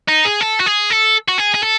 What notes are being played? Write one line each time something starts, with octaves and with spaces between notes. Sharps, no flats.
D#4
G#4
A4
F#4
G#4
A4
F#4
G#4
G#4
A4